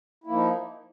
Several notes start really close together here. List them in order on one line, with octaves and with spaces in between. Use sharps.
E4 A#3 F3 D#4